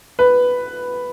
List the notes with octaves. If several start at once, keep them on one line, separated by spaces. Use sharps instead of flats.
B4